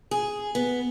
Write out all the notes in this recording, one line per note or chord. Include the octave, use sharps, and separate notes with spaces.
G#4
B3